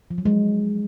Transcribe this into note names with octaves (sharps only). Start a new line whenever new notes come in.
F3
F#3
G#3